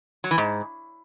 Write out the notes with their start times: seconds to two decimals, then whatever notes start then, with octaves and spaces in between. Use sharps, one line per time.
0.24 F#3
0.31 E3
0.38 G#2